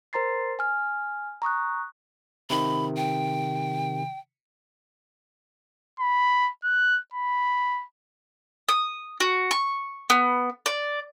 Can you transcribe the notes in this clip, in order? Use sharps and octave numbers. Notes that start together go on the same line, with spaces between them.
A#4 C5 A#5 C6 A6 C7
G#5 F6
A#5 C#6 D#6 F#6
C3 D#3 B5
G5
B5
F#6
B5
D#6
F#4
C#6
B3
D5